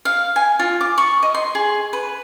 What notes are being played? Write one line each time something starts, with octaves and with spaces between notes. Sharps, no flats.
F5
G#5
F4
D6
C#6
D#5
C6
G#4
B4